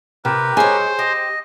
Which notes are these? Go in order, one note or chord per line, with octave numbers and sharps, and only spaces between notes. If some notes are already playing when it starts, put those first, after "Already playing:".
C3 G4 A#4 B4
G#3 C5 C#5 G#5
G4 D#5